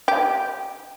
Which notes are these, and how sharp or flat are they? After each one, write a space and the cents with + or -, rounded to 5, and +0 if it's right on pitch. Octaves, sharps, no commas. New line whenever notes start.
G4 -15